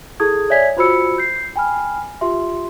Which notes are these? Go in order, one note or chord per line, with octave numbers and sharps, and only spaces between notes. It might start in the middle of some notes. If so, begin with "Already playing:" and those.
E4 G#4 A4 D#6 G#6
C#5 D5 E5 G#5 G#6 B6
F4 F#4 C5 B5 E6 C#7
G6 C7
G5 G#5 B5 F6
F4 G4 E5 C6